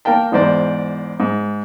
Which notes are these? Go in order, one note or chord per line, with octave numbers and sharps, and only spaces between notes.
A#3 A#4 F5 G5 A5
E2 G#2 C5 D5
G#2